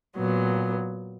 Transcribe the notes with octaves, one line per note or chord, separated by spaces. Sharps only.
A#2 F#3 B3